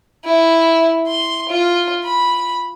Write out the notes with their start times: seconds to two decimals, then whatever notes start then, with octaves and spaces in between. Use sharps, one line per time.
0.25 E4
1.07 C6
1.49 F4
2.05 B5